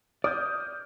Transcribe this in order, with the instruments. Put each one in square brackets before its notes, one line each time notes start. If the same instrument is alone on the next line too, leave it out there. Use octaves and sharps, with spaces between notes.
[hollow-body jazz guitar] D5 [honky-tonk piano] D#6 F6 G6